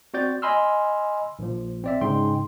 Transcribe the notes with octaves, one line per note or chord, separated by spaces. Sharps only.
C4 F#4 D5 G6 A6
D#5 G#5 B5 C6 E6 F6
A#1 F3
C4 D5 E5
G#2 C#3 G5 C6